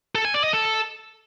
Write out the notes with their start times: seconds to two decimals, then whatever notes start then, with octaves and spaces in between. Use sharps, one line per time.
0.15 A4
0.25 G#5
0.34 D5
0.44 D#5
0.53 A4